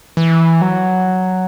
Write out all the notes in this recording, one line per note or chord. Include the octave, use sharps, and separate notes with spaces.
E3
F#3